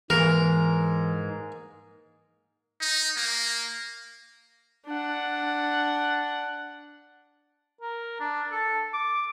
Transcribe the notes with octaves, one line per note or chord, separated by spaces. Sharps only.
G#2 E3 G#3 A#3 A#4
D#4
A#3
D4 F#5
A#4
D4
A4
D6